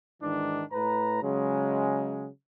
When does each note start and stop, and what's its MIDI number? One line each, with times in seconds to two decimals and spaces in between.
0.22 0.63 44
0.22 0.63 51
0.22 0.63 52
0.22 0.63 62
0.72 1.21 45
0.72 1.21 71
0.72 1.21 82
1.23 2.29 49
1.23 2.29 54
1.23 2.29 56